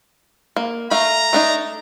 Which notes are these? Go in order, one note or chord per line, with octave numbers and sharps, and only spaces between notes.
A#3
A3 F5 A#5
A3 D4 D#4